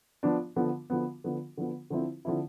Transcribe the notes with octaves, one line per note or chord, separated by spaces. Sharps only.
F3 B3 D4 F4
D3 F3 B3
D3 F3 B3
D3 F3 B3
D3 F3 B3
D3 F3 C4 E4
D3 F3 C4 E4